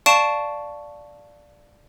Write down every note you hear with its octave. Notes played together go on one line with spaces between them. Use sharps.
D5 F5 A5 C#6 D7 E7